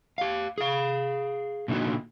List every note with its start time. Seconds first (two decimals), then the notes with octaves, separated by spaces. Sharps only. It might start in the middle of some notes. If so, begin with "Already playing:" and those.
0.18 G4 F5
0.58 G#4 F5
1.68 A#2 D3 B3 D#4 F#4